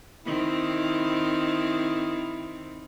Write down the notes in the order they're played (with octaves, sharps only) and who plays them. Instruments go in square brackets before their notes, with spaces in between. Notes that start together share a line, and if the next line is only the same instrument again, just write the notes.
[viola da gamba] D#3 C4 [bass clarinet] E4